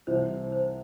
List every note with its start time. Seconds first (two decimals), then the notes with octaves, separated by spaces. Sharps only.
0.07 C2 C3 E3 C5
0.52 C5